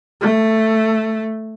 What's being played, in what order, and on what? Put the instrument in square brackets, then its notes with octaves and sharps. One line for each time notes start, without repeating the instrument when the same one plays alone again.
[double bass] A3